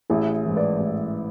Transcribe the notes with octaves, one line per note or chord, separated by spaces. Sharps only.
A1 E4 G#4
G#2 E3
B4 D5
A1